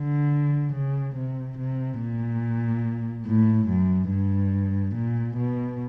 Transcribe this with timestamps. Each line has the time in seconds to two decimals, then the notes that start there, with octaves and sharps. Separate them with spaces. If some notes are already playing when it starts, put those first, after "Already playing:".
Already playing: D3
0.73 C#3
1.15 C3
1.58 C3
2.00 A#2
3.26 A2
3.68 F#2
4.10 G2
4.95 A#2
5.36 B2